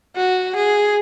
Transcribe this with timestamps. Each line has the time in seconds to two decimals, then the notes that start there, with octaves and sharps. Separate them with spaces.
0.16 F#4
0.56 G#4